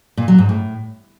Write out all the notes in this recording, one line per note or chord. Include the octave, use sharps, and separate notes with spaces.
A#2
F#3
G#2
A2